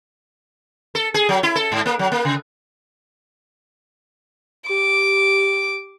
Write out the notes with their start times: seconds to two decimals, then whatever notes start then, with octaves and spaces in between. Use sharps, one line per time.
0.95 A4
1.14 G#4
1.29 F#3
1.43 E4
1.56 A4
1.72 G#2
1.86 A#3
1.99 F#3
2.12 A#3
2.25 C#3
4.69 G4 D6